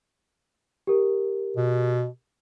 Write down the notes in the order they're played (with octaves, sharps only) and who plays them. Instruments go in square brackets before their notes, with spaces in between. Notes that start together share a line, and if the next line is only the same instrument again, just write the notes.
[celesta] G4 A#4
[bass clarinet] B2